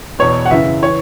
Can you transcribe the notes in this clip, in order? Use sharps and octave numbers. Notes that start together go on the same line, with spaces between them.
E2 B2 C#5
F#5
F#2 C#3 E3 E5
E3 C#5